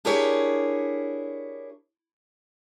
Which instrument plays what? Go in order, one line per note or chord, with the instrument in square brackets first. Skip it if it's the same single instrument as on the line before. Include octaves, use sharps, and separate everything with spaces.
[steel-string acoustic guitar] D4 E4 G4 G#4 A#4 C#5